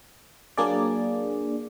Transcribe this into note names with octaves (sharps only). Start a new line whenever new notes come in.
F#3 A#3 D4 G#4 D5